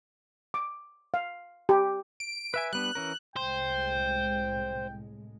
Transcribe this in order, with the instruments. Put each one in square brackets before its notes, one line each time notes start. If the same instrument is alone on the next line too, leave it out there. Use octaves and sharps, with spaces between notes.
[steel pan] D6
F5
G4
[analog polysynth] D7
[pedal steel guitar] B4 E5 G#5
[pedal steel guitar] G3 B3 D4 [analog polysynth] F#6
[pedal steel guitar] E3 C#4 A#4
[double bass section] C2 A2 G#3 [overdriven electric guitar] C5 [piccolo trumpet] G5